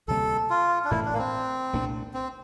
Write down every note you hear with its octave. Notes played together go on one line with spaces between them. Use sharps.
D2 C3 G3 A#3 A4
F4
D4
A1 A2 E3 A3 E4
D4
A#3
C4
C2 A#2 A3 D4
C4